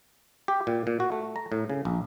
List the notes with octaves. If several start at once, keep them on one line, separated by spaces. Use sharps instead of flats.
G4
A#2
A#2
F#4
A3
A#5
A2
C#3
A#1